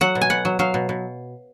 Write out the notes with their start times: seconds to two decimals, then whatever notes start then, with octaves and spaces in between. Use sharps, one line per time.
0.01 F#3 F#5
0.15 B2
0.21 G#5
0.30 B2 F#5
0.45 F#3
0.59 F#3 F5
0.74 B2
0.89 B2